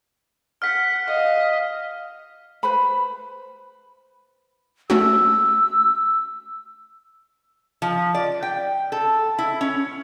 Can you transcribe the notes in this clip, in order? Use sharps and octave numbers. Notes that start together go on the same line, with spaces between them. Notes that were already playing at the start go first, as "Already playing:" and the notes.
F#5 F6 B6
D#5 F5
B4 C5 B5
A3 C#4 F#4 E6
F3
D5
G5
A4
E4
C#4